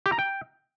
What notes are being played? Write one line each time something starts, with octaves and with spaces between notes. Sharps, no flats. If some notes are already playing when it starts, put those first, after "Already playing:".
G4
A#5
G5